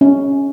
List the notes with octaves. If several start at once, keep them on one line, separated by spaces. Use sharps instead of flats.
C#4